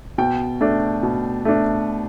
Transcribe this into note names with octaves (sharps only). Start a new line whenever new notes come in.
B2 G5
A3 D4
B2
A3 D4